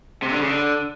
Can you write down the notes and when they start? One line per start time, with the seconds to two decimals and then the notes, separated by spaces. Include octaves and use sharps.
0.22 C3
0.31 D3
0.40 C#3
0.48 D3